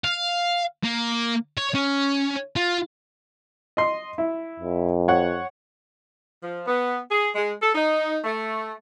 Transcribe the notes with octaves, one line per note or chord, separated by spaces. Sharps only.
F5
A#3
C#5
C#4
F4
D#5 C6
E4
F2
C#5 F#5
F3
B3
G#4
G#3
A4
D#4
A3